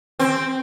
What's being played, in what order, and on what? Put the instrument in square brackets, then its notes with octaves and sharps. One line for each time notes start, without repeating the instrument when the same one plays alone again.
[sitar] C4